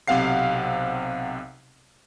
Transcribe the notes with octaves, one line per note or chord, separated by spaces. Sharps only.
B1 C3 C4 F5 F#5 C7